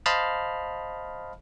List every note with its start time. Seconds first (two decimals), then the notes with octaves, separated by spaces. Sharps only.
0.06 C5 D#5 F5 A5 B5 F6